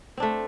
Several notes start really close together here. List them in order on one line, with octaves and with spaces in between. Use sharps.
C4 D4 A3